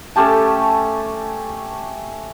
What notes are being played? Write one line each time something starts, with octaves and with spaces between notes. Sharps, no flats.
A3 C#4 G4 A5